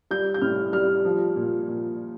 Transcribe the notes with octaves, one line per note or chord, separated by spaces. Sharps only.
G3 G6
G6
A2 F6
G3 F6
F3
A#2
A#2